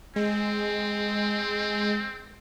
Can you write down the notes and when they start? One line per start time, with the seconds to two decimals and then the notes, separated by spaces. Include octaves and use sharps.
0.16 G#3 C4